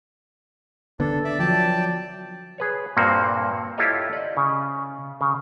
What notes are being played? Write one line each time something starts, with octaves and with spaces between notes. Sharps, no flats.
D3 B3 D4 A4
D5 E5
F3 F#3 D5 G5 A5
G#4 B4 C#5
G2 A#2 A#3 C4 F#4
E4 F4 G4 A4 C#5 D#5
D5 D#5
C#3
C#3